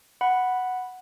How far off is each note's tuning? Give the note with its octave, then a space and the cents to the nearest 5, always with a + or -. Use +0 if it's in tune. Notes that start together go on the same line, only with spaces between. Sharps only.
F#5 +0 B5 +0